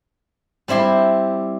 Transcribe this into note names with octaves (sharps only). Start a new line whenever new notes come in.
G3 C4 E4 G4 C6